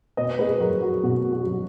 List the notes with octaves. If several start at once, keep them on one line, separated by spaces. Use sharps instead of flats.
B2 B4 D#5
G#4 B4
F#3 F#4 A#4
F#4
B2 F#4
F#4
F#3